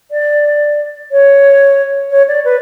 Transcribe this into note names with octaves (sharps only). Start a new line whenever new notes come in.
D5
C#5
C#5
D5
B4